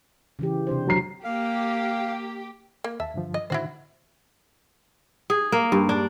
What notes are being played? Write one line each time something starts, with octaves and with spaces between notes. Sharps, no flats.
C#3 E3 G4
C3 D4 C5
F#3 A#5 C7
A#3 G4 F5
A#3
D#2 E5 A5
G2 D3 F3
D#5
A2 D3 D#3 E4 F#4 C5
G#4
A#3
G2
D4